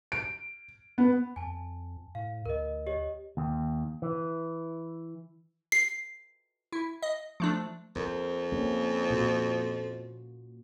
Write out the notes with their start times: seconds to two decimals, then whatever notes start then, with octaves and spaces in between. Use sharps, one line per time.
0.12 D7
0.98 B3
1.36 F2 G#5 A5
2.15 A2 F5
2.46 D2 A#4 D#5
2.87 G4 C#5 D#5
3.37 D#2
4.02 E3
5.72 C7
6.72 E4
7.02 D#5
7.40 F3 A3 D4
7.96 F2 A#4 C5
8.52 A#3 C#4 G4
9.10 A#2 F4 F#4